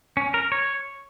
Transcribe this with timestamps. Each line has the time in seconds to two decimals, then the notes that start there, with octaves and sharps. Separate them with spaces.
0.17 C#4
0.34 A#4
0.52 C#5